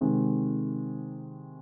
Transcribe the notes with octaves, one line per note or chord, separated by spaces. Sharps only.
C3 D#3 G#3